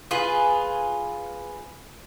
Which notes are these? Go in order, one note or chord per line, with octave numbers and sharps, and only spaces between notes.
F4 G#4 B4